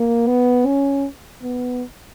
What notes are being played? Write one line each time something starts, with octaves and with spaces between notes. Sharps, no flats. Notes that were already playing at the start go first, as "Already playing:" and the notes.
Already playing: A#3
B3
C#4
B3